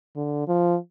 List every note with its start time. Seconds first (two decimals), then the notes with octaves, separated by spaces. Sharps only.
0.16 D3
0.48 F3